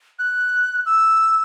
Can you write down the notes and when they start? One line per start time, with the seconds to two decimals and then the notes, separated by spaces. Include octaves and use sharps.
0.19 F#6
0.86 E6